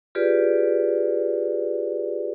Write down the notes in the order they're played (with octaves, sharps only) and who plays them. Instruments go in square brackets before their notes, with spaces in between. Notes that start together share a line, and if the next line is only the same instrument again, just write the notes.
[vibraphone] F4 G4 G#4 B4 D5